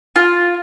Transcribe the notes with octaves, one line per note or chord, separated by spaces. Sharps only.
F4